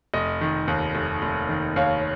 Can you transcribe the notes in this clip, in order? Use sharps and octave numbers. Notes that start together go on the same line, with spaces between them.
F1 D#5
D#3
D#2
F1
F1
D#3
D#2 C#5 F5